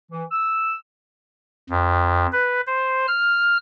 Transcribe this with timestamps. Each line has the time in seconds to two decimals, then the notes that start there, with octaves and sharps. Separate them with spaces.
0.11 E3
0.31 E6
1.70 F2
2.32 B4
2.67 C5
3.08 F6